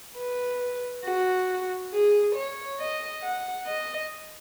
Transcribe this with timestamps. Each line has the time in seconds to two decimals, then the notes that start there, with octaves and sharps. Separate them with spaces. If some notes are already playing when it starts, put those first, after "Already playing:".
0.17 B4
1.04 F#4
1.93 G#4
2.35 C#5
2.80 D#5
3.23 F#5
3.66 D#5